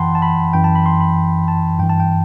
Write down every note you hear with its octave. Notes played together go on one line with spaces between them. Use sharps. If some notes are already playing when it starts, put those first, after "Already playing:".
Already playing: F#2 E3 F#5 G5 A5 B5 C6
A5
B5
F#2 E3 G5
A5
B5
C6
B5
A5
G2 E3 G5
A5
G5